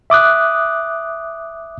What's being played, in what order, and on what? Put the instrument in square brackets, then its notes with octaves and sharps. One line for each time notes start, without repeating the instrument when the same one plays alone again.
[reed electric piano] E5 D6 D#6 F#6